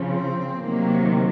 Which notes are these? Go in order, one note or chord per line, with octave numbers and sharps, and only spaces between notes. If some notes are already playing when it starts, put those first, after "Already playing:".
Already playing: C#3 F3
C4
C3 D#3 F#3 A#3